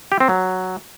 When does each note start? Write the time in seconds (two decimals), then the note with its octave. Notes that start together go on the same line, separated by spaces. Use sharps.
0.12 G4
0.20 C4
0.29 F#3